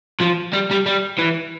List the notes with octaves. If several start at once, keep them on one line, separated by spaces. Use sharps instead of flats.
F3
G3
G3
G3
E3